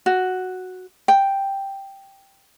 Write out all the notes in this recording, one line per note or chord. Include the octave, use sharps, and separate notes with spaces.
F#4
G5